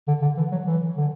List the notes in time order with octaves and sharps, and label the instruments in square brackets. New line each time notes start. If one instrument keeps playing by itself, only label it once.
[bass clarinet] D3
D3
E3
F#3
E3
D3